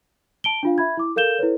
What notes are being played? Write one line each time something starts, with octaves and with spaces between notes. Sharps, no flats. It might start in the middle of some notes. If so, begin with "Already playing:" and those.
A5 D7 G7
D4 F4 F5
E5 B5 G#6
E4 D6
A4 A#4 F5 G6 E7 G7
E4 A4 B4 C#5